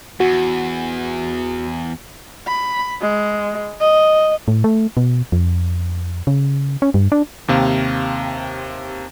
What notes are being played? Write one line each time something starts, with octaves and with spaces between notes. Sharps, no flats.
E2 F#4
B5
G#3
D#5
A2
A3
B2
F2
C#3
C#4
G2
D4
D#2 C3 F5